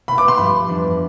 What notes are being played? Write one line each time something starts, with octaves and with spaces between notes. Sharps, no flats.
B2 A3 E4 B5
D6
C6
G2 F3 A3 B5
F2 E3 B3 D4